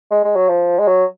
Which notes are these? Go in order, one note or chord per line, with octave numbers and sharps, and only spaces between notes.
G#3
G#3
F#3
F3
G#3
F#3